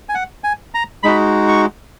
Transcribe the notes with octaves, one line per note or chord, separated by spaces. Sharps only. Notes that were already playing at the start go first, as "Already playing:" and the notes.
G#5
F#5
G#5
A#5
G#3 D#4 F#4 B5
C#6